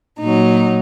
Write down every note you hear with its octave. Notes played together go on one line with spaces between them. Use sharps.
A#2 D#4
F#3